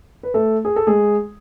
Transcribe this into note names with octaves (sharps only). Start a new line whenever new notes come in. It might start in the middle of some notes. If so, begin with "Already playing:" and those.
B4
A3 A4
G#4
A4
G#3 G#4